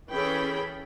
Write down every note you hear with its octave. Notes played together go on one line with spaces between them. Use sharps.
E3 C#4 G#4 A4 G5 B5